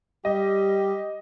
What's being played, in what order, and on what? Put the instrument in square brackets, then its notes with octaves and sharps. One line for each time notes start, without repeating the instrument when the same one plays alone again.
[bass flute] G3 [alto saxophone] G4 [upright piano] D#5